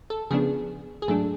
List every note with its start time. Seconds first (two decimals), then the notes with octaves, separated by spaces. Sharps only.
0.10 A4
0.31 C#3 F3 B3 D4 G#4
1.02 G#4
1.08 G#2 F#3 A3 D4 A4